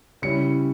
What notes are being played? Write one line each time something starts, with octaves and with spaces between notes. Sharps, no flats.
C#3 G3 C#4 E4 C#7